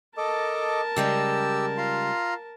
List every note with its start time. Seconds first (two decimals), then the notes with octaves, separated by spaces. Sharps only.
0.17 A4 A#4 D#5 A5 D6
0.96 C#3 G3 G#3 G4 E6
1.78 F4 A#5 C6